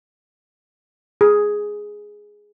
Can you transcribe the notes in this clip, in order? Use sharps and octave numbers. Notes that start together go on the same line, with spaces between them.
G#4